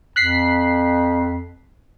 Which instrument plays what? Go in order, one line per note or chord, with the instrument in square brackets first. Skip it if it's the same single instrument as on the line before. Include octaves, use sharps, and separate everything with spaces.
[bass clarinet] F2 [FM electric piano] F#6 B6 C7